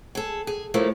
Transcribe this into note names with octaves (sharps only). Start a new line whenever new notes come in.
G#4 A4
G#4
A2 F3 A3 A#3